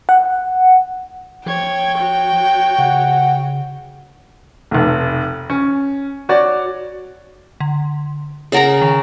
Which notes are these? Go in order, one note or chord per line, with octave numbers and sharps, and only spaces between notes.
F#5
F3 C#5 G5 G#6
F#4 C#5
C#3 F#5
F1 B1
C#4
F#4 C#5 D5
D3
C#3 G#4 A#4 C#5 F#5 A#5
D#3